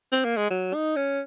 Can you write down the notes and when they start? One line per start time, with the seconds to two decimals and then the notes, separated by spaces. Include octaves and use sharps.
0.12 C4
0.25 A#3
0.37 G#3
0.50 F#3
0.74 D#4
0.97 C#4